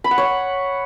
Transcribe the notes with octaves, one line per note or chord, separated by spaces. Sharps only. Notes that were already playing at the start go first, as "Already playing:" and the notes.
B5
F#5
C#5